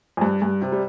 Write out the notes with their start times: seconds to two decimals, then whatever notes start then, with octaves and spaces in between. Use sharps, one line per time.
0.17 F2
0.21 G2
0.42 G2
0.61 C3
0.72 G3